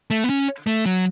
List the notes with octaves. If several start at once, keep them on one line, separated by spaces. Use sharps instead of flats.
A3
B3
C#4
A3
F#3